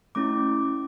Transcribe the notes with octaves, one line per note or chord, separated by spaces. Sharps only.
A3 C#4 E4 D6